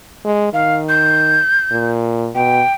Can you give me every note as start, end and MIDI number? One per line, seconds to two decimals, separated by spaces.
0.25 0.49 56
0.53 1.39 51
0.53 0.75 77
0.89 1.87 91
1.71 2.30 46
2.35 2.61 47
2.35 2.73 79